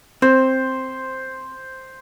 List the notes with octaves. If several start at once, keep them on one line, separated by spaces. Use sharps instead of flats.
C4 C5